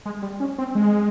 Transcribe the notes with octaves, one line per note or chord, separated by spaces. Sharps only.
G#3
G3
C#4
C4
G#3